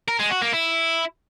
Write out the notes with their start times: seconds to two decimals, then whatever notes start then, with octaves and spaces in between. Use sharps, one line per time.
0.08 A#4
0.19 G#3
0.31 F#4
0.42 A#3
0.53 E4